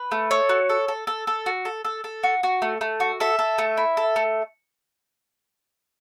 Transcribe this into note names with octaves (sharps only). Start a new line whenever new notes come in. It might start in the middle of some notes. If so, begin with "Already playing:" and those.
Already playing: B4
A3
A4 C#5
F#4
A4
A4
A4
A4
F#4
A4
A4
A4
F#4
F#4
A3
A3
F#4
A4 E5
A4
A3
E4
A4
A3